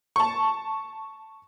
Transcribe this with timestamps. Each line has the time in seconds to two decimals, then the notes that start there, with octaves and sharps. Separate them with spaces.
0.16 A5 C#6